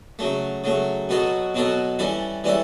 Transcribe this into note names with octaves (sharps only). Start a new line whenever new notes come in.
C#3 F#3 A3
C#3 F#3 A3
B2 F#3 B3 F#4 A4
B2 F#3 B3 F#4 A4
E3 G3 C#4 E4 A4
E3 G3 C#4 E4 A4